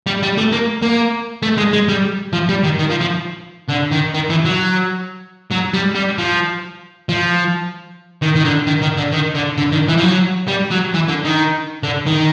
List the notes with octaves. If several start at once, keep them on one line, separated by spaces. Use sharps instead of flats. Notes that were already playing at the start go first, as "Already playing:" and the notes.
G3
G3
A3
A#3
A#3
A3
G#3
G#3
G3
F3
G3
D#3
D#3
F3
F3
D3
D#3
D#3
E3
F#3
F#3
G3
G3
F3
F3
D#3
D#3
D3
D#3
D#3
D3
D#3
D3
D3
D#3
E3
F3
F#3
G3
F#3
E3
D3
D#3
D3
D#3